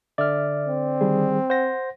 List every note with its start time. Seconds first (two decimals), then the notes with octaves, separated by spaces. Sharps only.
0.18 D3 D5 E5 F6
0.67 C4
1.01 D#3 G3 G#4
1.50 C5 F#5 A#6